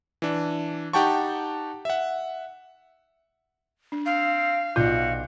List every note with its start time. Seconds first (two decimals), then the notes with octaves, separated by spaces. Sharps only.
0.22 E3 D4
0.93 D#4 G4 F#5 G5 A5 C#6
1.85 E5 F#5
3.92 D4
4.06 C4 F5
4.76 B1 F4 F#4 D5 G6